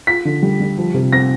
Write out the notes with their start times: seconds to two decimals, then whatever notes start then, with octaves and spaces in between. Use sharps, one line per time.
0.07 F4 B6
0.25 D3
0.42 G3
0.60 G3
0.78 F3
0.94 C3
1.12 C4 A#6